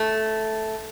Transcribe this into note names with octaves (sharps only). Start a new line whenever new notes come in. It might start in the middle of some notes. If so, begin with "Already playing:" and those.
Already playing: A3